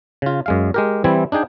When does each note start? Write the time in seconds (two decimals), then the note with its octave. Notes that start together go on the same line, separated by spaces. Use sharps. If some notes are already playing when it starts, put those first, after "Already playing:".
0.22 C#3 F4
0.46 F#2 G#3 F5
0.74 G#3 G4 A#4
1.04 E3 G3 C4 E4 G#5
1.32 D4 D#4 G#4 G5